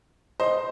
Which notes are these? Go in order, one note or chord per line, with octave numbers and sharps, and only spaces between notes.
C5 D#5